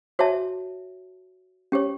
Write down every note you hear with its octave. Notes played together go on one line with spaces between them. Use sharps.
F#4 C#5 E5 A5
C#4 G4 C#5